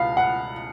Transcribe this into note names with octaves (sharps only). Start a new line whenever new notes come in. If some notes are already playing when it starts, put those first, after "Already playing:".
Already playing: C#2 B2 F5 B5
F#5